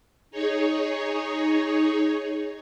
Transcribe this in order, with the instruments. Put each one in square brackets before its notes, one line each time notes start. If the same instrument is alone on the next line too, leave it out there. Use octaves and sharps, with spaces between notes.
[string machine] D#4 G#4 C#5